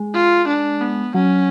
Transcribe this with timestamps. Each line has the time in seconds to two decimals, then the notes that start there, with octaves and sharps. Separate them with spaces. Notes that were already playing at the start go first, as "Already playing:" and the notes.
Already playing: G#3
0.14 F4
0.48 D4
0.81 B3
1.14 F#3 C#4